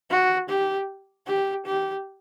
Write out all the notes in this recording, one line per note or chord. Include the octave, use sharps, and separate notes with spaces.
F#4
G4
G4
G4